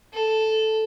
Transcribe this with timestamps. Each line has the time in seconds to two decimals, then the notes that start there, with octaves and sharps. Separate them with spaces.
0.13 A4